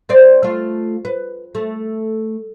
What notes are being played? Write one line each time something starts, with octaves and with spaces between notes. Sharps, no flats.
C4 C5 D5
A3 F4
B4
A3